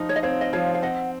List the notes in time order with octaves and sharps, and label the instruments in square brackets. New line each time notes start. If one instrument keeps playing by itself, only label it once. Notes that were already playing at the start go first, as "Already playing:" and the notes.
Already playing: [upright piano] F3 D#4
[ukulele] C#5
D#5
[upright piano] C4 [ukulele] C#5 F5
[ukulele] D#5
[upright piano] F3 [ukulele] C#5 F5
[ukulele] F5
[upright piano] C4 [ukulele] D#5 F#5